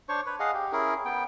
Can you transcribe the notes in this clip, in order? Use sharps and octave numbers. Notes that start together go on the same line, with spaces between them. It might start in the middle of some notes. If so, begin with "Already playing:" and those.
D4 C5 C#5 C#6
B4 C#5
G#4 D#5 F5 F#5
G4
C#4 E4 G#4 A#4
B3 G5